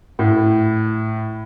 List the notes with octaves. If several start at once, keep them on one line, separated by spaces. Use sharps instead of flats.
A2